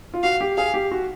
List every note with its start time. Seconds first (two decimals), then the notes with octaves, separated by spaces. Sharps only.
0.14 F4
0.23 F#4 F5
0.41 G4
0.57 G#4 F5
0.74 G4
0.91 F#4